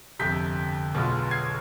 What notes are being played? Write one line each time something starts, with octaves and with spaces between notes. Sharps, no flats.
G1 F2 C3 G6 B6
B1 B2 G#3 B3 F4
G#6 C7